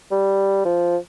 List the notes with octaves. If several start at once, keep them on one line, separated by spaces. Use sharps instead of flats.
G3
F3